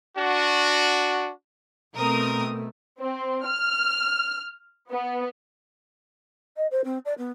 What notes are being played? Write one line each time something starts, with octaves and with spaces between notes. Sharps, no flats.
D4 F#4
B2 A3 C4 A#4 D#6
C4
F6
B3
D#5
C5
C4
D5
B3